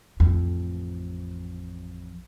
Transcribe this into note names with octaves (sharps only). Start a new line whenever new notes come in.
A1 F2